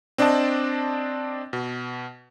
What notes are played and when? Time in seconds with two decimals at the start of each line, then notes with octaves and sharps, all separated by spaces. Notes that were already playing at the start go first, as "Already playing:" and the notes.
0.18 C4 D4 D5 D#5 A5
1.53 B2